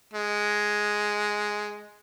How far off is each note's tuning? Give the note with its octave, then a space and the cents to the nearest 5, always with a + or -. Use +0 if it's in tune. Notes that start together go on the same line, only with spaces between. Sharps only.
G#3 +5